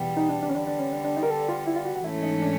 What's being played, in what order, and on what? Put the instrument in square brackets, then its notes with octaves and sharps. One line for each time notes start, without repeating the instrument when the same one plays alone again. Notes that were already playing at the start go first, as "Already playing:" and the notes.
Already playing: [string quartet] E2 B2 G3 B3
[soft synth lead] D#4
D4
D4
C#4
[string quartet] D3 G3 B3 [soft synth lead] D4
[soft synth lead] D4
C#4
D4
D4
D#4
A#4
A4
F4
E4
F4
F#4
F#4
[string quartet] G#2 E3 A3 C#4 [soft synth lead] E4
[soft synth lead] D#4
D4